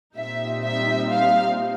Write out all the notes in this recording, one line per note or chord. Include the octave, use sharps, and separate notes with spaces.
A#2 G3 C4 D#4 E5
E5
F5